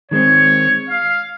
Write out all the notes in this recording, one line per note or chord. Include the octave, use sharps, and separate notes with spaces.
D#3 G#3 C4 C#5
F5